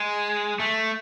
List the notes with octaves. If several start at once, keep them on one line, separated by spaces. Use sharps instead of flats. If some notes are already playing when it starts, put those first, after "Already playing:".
Already playing: G#3
A3